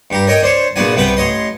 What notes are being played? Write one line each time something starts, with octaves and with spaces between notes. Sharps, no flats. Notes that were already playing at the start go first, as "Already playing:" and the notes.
G2 G4 A#5
A#4 C#5 D#5 G5 G#5
D4 C5 C#5 C#6
E2 A#2 B3 D4 F#4 G#5
C2 C3 B3 B4 G5
A1 C#5 D#5 C6